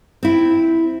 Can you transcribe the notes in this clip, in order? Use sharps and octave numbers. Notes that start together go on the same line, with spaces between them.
C4 E4